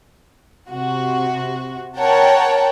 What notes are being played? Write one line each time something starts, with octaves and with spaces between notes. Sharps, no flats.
C3 F#4
A#4 C#5 F#5 G5 A5 A#5